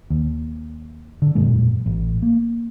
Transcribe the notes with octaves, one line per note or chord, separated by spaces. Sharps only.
D#2
D3
E1 F#2 A#2 G#3
A1
A#3